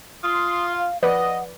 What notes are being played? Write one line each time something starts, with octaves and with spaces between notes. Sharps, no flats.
F4 C6 D#6
F5
F3 B4 D5 D#5 F#5